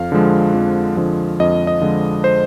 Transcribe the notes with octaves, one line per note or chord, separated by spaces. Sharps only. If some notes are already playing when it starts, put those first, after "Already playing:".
Already playing: F2 F5
D3 F3 G#3
F2
D3 F3 G#3
F2 D#5
D#5
D3 F3 G#3
C5